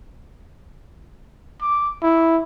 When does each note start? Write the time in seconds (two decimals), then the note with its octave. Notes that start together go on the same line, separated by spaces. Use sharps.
1.62 D6
2.02 E4